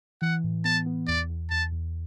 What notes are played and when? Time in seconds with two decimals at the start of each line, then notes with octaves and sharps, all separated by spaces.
0.22 E3 F#5
0.44 A2
0.65 B3 A5
0.86 B3
1.07 E2 D5
1.30 E2
1.51 E2 A5
1.72 E2